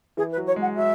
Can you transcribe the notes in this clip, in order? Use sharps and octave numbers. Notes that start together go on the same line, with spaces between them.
E3 G#4
B4
F#3
C#5
G#3
F#5
F#3 E5